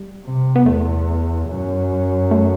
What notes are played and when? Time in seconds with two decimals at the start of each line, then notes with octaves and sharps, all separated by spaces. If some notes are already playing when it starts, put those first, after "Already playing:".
Already playing: G3
0.25 C3
0.56 B3
0.66 E2 A3
1.49 F#2
2.31 A3